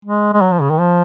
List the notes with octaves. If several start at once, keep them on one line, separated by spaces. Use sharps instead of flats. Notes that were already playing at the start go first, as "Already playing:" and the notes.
G#3
G#3
F#3
F3
C#3
D#3
F3